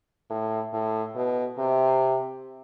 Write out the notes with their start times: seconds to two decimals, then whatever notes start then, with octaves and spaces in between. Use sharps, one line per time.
0.30 A2
0.73 A2
1.15 B2
1.58 C3